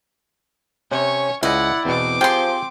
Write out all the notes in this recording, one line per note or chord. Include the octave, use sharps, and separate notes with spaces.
C3 C#4 C#5
C#2 E4 D5 D#5 F#5
E2 B2 C4 D6
F3 F4 G4 G#4 G5 C6